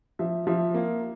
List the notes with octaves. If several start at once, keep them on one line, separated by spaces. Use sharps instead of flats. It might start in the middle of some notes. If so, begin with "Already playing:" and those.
F3 E5
F3 E5
A#3